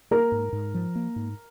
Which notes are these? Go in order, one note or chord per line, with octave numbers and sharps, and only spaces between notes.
A#3 A#4
G#2
G#2
F3
A#3
G#2